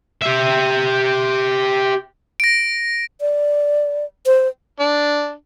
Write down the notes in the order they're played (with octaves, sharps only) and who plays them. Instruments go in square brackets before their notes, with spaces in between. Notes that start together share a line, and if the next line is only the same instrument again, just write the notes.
[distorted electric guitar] G4 E5
[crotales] A#6 D7
[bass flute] D5
C5
[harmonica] D4